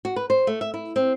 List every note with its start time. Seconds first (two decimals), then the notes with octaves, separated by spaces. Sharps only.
0.05 F#4
0.16 B4
0.30 C5
0.47 A3
0.61 E5
0.74 E4
0.96 C4